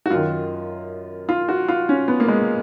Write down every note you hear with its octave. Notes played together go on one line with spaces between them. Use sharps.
F#4
F#2 D#3 F4
F4
F#4
F4
C#4
B3
A#3
G#3